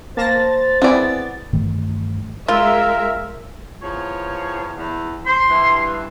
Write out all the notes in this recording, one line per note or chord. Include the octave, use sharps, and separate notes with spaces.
A#3 C5 A5 A6 A#6
B3 C4 E4 G#4 D5
G2 D#3 E3 A3
G#3 F4 A#4 E5
E2 F3 C#5
E2
C5 C6
G2 E3